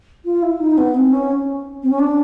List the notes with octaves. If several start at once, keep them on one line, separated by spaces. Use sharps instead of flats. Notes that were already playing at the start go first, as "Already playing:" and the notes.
F4
E4
D#4
B3
C4
C#4
C4
C#4
D4